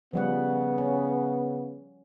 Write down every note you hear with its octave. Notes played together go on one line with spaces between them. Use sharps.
C#3 F3 G3 B3 F#5
C#4